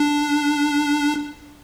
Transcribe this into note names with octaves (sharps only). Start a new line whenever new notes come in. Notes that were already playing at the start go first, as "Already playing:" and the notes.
Already playing: D4